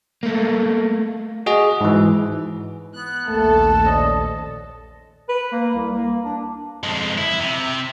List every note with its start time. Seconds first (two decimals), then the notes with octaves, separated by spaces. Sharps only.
0.23 A3 A#3
1.46 F#4 G#4 D#5
1.81 G#2 E3
2.94 B3 F#6
3.26 A#1 D#2 A3 A#3 A4 A5
3.84 C#4 C5 D5 D#5
5.29 B4
5.52 A#3
5.74 C2
5.93 A#3
6.24 D4
6.83 F2 G#3
7.18 E4
7.40 C3